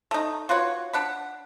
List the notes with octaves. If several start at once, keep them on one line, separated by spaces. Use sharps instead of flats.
A3 D#4
F4 F#4 B4 C#5
D4 F#5 B5